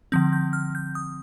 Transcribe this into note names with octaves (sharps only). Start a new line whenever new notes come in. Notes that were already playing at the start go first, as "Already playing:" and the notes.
D3 F3 C4 G6
G6
F6
G6
D#6